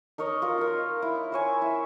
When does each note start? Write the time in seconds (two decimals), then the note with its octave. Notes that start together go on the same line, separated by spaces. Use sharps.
0.18 D#4 A#4 C#5 D#5
0.42 F4 A#4
0.58 D#4 A#4
1.02 E4
1.32 C5 C#5 G#5
1.62 E4 E5